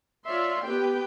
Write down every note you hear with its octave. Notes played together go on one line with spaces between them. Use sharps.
F4 C#5 D5 E5 C6
B3 G4 B4 G5